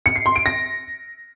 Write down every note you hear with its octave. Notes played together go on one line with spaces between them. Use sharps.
C#7
C7
C6
D7
A#6